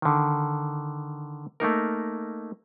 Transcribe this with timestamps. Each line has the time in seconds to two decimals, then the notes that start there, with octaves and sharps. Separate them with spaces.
0.02 D3 D#3
1.60 A3 A#3 D#4 A#4